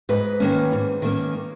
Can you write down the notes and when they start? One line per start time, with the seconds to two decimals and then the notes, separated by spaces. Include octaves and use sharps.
0.09 G#2 B4 D#5
0.40 D#3 A#3 C#4
0.72 G#2
1.02 D#3 A#3 C#4